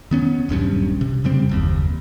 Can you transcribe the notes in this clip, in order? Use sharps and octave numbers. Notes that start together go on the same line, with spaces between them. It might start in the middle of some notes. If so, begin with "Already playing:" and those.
D#3 B3 C#4
D#1 B1 G2 C#4
C3
F2 C#3 G3 C4
F#1 D#2